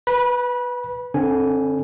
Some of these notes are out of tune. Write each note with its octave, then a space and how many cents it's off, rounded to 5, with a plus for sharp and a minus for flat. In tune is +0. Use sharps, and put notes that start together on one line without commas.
B4 +0 B5 -30
D3 +0 C4 +35 G#5 +0